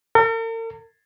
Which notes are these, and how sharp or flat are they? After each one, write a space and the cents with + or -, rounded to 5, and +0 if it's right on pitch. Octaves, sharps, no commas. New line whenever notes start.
A#4 -45